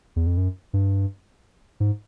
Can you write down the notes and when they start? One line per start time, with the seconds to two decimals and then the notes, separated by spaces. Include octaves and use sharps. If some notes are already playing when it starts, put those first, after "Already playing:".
0.16 E2
0.27 F2
0.37 F#2
0.73 G2
1.80 G#2